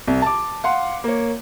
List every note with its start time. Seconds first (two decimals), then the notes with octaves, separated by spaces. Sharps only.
0.07 C2
0.22 A5 D6
0.64 F5 F#5 C6
1.04 A#3 C#5